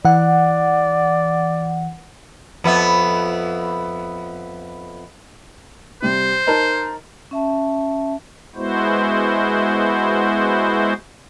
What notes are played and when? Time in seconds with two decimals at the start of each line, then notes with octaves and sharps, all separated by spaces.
0.05 E3 D5 F#5
2.64 F2 B3 E5
6.02 C3 G3 C5
6.47 D#4 A#4 A5
7.31 C#4 E5 A5
8.56 G#3 B3 E4 F#4 C5